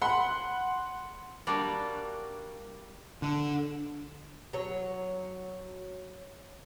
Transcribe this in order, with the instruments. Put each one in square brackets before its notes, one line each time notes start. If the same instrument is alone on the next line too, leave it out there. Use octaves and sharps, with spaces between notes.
[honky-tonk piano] F#5 B5 C6
[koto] G3 A#3 D4 F#4
[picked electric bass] D3
[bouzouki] F#3 C#5